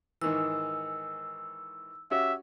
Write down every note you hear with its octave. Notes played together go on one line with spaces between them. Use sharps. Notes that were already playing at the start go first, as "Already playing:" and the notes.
G#2 D#3 E3 E6
C#4 F#4 G4 E5